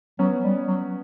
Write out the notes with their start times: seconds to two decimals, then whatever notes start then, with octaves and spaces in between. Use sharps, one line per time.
0.19 F#3 B3 C#4
0.44 G3
0.67 F#3